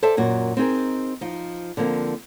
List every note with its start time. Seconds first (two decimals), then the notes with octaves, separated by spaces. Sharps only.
0.02 A4 C5 D5 E5 A5
0.17 F#2 A#2 F#4
0.57 C4 D#4 G#4 A#4
1.21 F3 D#4
1.77 D3 F3 A#3 C4